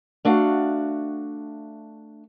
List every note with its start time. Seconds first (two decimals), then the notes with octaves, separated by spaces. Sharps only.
0.25 A3 D4 F#4 F5